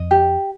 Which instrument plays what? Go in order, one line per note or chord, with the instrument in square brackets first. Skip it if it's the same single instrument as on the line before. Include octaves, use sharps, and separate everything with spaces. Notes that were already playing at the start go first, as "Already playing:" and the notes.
Already playing: [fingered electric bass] F2 [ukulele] D#5
[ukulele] G4